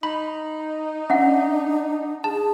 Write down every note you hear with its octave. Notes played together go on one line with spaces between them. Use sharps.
D#4 B5
C#4 D4 E5 F#5
G#4 A5